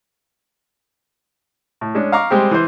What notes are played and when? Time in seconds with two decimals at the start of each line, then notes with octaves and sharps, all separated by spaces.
1.81 A2
1.95 G#3 C#4 D4
2.12 F5 A#5 C#6 D6
2.30 G3 G#3 C4 G4
2.51 E3 C5